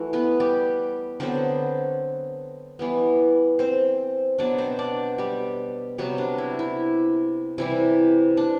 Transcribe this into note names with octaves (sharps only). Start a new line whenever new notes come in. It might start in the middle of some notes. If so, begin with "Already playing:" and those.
Already playing: E3 A3 F#4
B3 B4
G3 G4
D3 F#3 B3 C4 C5
E3 G3 B3
C4 C5
B2 F#3 B3 D4 D5
C4 C5
D4 D5
G3 G4
C3 F#3 G3 B3 F#4
D4
E4
E4
C3 E3 G3 E4
D4